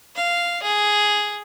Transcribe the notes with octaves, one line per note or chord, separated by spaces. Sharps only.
F5
G#4